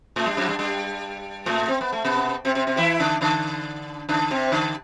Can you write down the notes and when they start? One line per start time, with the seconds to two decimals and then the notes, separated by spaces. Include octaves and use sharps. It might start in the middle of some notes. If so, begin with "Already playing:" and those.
0.16 A2 A3
0.26 G2 G3
0.37 F#2 F#3
0.49 G2 G3
0.59 G2 G3
1.46 A2 A3
1.68 C4
1.81 B3
1.92 A3
2.05 B2 B3
2.45 C3 C4
2.55 C3 C4
2.67 C3 C4
2.77 E3 E4
3.00 D3 D4
3.21 D3 D4
4.09 D3 D4
4.31 C3 C4
4.52 D3 D4